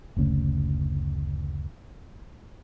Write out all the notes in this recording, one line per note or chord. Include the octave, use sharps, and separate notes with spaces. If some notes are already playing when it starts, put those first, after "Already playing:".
F#1 D2 C#3 A3